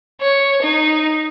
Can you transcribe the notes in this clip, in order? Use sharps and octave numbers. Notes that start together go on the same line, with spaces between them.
C#5
D#4